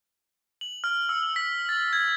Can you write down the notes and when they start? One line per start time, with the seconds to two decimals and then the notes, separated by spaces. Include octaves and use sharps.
0.61 F#7
0.84 F6
1.09 E6
1.36 B6
1.69 A6
1.93 G#6